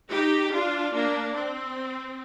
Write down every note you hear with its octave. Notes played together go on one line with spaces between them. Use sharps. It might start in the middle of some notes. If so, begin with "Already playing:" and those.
D#4 G4
D4 F4
A#3 D4
C4